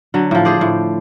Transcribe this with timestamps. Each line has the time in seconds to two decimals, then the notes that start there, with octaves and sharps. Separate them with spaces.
0.14 D3 F#3
0.31 A2 F3
0.45 G#4 C5 D5
0.61 A2